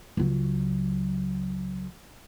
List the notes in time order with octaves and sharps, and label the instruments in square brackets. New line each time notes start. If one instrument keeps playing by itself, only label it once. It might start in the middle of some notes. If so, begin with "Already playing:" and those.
[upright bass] C#2 F#3